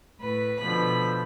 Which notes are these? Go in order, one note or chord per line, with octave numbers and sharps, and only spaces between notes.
A2 B4
B2 D3 F3 B5